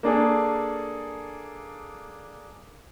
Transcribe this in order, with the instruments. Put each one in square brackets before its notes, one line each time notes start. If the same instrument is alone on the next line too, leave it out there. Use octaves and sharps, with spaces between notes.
[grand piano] A#3 D4 G#4 A4